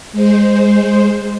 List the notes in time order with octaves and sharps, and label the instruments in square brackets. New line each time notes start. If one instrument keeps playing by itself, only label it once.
[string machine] G#3 C5